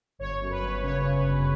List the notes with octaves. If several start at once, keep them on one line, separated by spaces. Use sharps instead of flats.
G1 C#5
F#2
B4
G1
C#3 C#5
C#3
G1